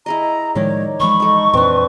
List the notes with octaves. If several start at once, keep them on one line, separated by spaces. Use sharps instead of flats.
E4 G#4 D#5 A#5
A2 D#3 F3 G#3 D#4 C#5 D5
E3 F3 G#3 B5 C#6
D#4 A4
F2 A#2 E3 C4 D4 B4